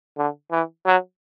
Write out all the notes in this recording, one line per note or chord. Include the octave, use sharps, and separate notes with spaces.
D3
E3
F#3